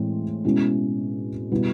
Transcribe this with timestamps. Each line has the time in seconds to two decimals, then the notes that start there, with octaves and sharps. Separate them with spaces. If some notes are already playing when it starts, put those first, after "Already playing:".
Already playing: A2 E3 G#3 C4
0.44 B2 G#3 C#4 E4
1.51 B2 G3 B3 E4